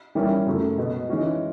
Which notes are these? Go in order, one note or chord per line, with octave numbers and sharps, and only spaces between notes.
E3 G3 A#3 C#4 E4
F#2 C#3 F#3 A3
B2 G#3 B3
E3 G#3 C#4 F#4